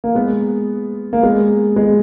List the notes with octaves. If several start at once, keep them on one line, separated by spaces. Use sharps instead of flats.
A#3
G#3 B3
A#3
G#3 B3
G#3 B3